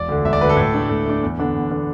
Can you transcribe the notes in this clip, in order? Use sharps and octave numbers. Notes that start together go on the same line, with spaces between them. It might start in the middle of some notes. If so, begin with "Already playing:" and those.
Already playing: E1 D5
D2 D3
E1 E5
D5
D2 D3 B4
A4
A2
A3 D4
A2
A3 D4
E2
D3 B3 D4
E2
D3 B3 D4